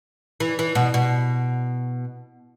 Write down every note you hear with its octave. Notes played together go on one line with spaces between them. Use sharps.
E3
E3
B2
B2